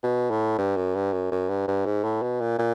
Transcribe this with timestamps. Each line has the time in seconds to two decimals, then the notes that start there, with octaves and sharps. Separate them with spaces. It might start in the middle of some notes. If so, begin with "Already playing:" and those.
0.03 B2
0.30 A2
0.58 G2
0.76 F#2
0.95 G2
1.13 F#2
1.32 F#2
1.49 G2
1.68 G2
1.86 G#2
2.04 A2
2.22 B2
2.40 A#2
2.58 A#2